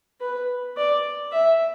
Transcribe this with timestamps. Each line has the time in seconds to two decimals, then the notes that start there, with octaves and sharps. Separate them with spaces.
0.21 B4
0.77 D5
1.32 E5